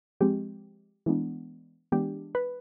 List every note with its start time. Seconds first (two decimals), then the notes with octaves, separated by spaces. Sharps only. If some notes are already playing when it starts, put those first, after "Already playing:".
0.20 F3 G#3 C4 G4
1.06 E3 G#3 B3 D4
1.92 E3 G#3 B3 D4 G4
2.35 B4